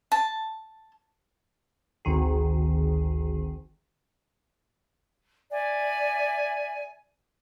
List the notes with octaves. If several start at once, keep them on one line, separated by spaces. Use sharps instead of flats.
A5
G#1 D2 D#3 G#4
D5 E5 G#5